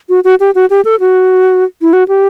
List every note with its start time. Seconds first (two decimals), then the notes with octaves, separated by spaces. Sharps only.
0.09 F#4
0.24 F#4
0.40 G4
0.55 F#4
0.70 G4
0.85 A4
1.00 F#4
1.82 E4
1.93 F#4
2.08 G4